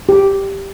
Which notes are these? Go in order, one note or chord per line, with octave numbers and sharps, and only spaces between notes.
G4